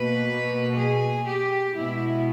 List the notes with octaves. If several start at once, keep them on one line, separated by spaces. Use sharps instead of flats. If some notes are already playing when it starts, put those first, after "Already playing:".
Already playing: B2 A#3 B4
G#4
G4
B2 G#3 B3 E4